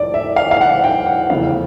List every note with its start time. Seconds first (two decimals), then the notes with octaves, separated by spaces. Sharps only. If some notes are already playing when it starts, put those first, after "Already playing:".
Already playing: F1 D5
0.14 E5
0.36 F5
0.51 F5
0.61 F#5
0.84 G5
1.06 F#5
1.30 F1 E2 C#3 F5